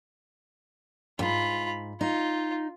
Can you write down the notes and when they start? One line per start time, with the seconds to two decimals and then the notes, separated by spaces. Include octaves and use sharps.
1.19 F2 G#2 F4 B5
2.01 D#4 F4